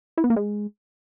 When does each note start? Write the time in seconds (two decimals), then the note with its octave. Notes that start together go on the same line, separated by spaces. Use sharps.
0.18 E4
0.24 B3
0.30 A#3
0.36 G#3